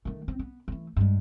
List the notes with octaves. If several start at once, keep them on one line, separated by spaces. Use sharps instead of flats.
D#3 A3
C4
B3
E3 A3
G2 G#3